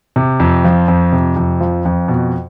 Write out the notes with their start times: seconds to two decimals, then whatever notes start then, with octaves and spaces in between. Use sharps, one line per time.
0.16 C3
0.40 F2
0.64 F3
0.88 F2
1.12 C3
1.36 F2
1.60 F3
1.85 F2
2.08 B2